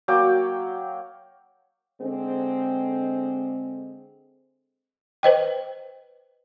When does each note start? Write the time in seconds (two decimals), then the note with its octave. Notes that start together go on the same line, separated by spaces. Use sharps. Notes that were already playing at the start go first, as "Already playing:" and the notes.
0.08 F#3 A#3 G5 D6
2.00 D3 G#3 C4
5.23 B4 C5 D#5 G5